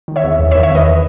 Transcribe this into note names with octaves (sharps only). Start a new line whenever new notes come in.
D#3
C#5 E5
E2
E2
C#5 E5
D#3
C#5 E5
E2 B4 D#5